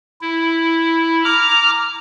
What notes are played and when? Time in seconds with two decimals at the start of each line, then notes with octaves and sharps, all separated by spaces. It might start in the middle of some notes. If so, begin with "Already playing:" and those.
0.21 E4
1.24 A#5 D6 F6